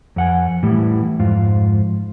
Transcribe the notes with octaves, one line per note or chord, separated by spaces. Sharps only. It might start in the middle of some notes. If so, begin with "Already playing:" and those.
F2 F#5 G#5
A2 E3 G3
F2 G#2 F4